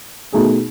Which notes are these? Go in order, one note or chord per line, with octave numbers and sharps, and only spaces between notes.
B2 A3 D#4 G#4